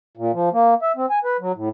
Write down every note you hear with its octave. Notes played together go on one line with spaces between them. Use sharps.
A#2
F3
A#3
E5
C4
G#5
B4
F#3
A2